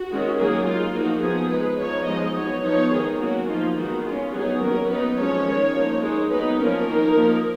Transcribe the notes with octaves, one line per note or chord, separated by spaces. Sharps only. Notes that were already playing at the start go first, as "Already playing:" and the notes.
Already playing: F#4
D#3 G#3 C#4
D#3 F#3 A#3 G#4
G#3 D#4 F4
F3 A#3 D#4 F#4
F3 B3 D#4 G#4
G#3 D#4 B4
F3 B3 D#4 C#5
F3 G#3 D#4 D#5
F#3 B3 D#4 C#5
F3 B3 D#4 C#5
D#3 G#3 B3 D#4 G#4
F#3 A#3 C#4 F#4
F3 A#3 D#4 F4
D#3 G#3 B3 F#4
G#3 C#4 F4
F#3 B3 D#4 G#4
D#3 F#3 A#3 C#4 A#4
F#3 B3 D#4 B4
F3 G#3 C#4 C#5
D#3 G#3 C#4
F3 A#3 D#4
G#3 D#4
F#3 B3 D#4 B4
F3 A#3 C#4 A#4
D#3 A#3 D#4
F3 A#3 D#4